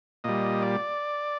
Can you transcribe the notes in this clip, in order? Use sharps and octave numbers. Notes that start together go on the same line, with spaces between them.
A#2 G3 D#5
D5